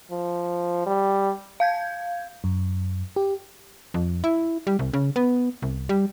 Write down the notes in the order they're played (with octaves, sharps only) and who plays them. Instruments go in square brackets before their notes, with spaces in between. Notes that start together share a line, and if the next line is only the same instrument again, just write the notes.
[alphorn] F3
G3
[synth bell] F5 G6 G#6
[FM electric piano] F#2
G4
[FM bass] F2
E4
G3
C2
C#3
B3
C2
G3